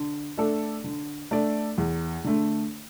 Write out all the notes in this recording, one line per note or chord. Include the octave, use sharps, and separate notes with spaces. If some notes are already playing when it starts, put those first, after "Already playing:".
Already playing: D3
A3 D4 A4 D5
D3
A3 D4 A4 D5
E2
D3 A3